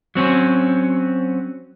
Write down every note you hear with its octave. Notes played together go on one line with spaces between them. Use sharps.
F#3 C4 C#4